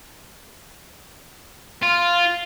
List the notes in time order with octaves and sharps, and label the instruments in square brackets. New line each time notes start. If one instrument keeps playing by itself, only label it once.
[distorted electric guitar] F4